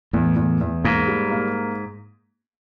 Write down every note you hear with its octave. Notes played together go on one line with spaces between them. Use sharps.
E2 A2
E2
E2
G#2 A#3
G3
A#3